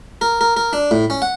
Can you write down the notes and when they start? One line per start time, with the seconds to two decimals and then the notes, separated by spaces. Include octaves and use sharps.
0.21 A#4
0.41 A#4
0.57 A#4
0.73 D4
0.91 A2
1.10 C#4
1.22 F#5